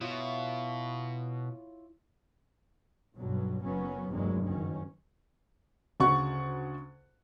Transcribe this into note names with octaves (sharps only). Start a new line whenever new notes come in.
B2 E4 F4 C#5
B1 G2 B2 F#3
F#1 F#3 B3 C#4
F1 E2 G2 F#3 G#3 A#3
F#1 D#3 F#3 C#4
D2 C#3 F#4 F#5 C#6